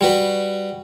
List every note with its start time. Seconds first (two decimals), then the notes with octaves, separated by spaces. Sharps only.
0.01 G3 F#4 B4